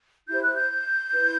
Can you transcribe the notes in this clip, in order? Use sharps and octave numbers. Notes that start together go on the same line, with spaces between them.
E4 G4 C5 G6
F#6
G6
E4 B4